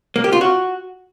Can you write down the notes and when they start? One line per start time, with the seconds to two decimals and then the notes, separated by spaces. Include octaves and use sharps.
0.16 A#3
0.24 G4
0.33 F4
0.41 F#4